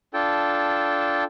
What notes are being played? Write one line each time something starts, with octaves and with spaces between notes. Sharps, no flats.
D4 F4 A4 G5 A5